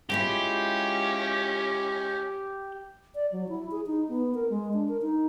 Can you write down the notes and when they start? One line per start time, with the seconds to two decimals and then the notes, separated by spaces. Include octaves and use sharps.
0.10 G#3 C#4 E4 F4 G4
3.15 D5
3.32 F#3
3.49 E4
3.71 G#4
3.87 D#4
4.09 B3
4.35 A#4
4.50 G#3
4.74 D4
4.88 A#4
5.02 D#4